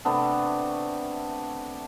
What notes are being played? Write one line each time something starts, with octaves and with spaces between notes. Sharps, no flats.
C3 A3 B3 D4